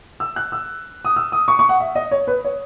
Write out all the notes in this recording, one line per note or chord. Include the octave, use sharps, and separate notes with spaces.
E6
F#6
E6
D#6
E6
D#6
C#6
C#6
F#5
E5
D#5
C#5
B4
C#5